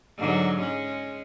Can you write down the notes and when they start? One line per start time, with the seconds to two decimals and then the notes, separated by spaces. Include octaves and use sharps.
0.17 G#2 D3 F#3
0.59 G#3 C#4